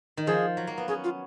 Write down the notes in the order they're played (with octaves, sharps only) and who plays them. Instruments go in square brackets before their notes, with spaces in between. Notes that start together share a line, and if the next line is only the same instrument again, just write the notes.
[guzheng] D#3
[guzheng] F3 [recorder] G#4
[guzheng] F#3
A#3
B3
[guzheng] C#4 [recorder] G#4
[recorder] F4